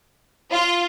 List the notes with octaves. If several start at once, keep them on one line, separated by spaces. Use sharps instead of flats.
F4